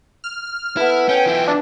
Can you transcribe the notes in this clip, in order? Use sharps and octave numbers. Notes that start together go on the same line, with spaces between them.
F6
B3 E4 A4 B4
C#4 G5 G#5
F3 E4
D4